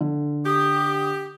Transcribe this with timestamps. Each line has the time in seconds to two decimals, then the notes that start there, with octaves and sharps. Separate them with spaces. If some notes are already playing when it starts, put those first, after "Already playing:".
0.01 D3
0.46 G4 D#6